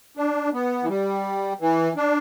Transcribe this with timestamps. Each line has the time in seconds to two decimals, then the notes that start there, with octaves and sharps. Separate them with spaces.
0.17 D4
0.53 B3
0.83 E3
0.89 G3
1.61 E3
1.97 D4